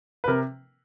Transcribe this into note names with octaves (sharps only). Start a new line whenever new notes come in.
B4
C3 A#4